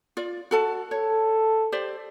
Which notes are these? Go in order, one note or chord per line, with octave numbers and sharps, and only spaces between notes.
F4 D5
F#4 A4 A5
A4 C#5
G4 C5 D5